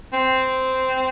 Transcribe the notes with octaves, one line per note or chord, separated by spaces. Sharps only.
C4